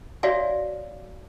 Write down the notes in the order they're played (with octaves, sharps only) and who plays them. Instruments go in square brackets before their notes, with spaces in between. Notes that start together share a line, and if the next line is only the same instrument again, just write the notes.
[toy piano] F#4 C#5 D5 E5 F5 G#5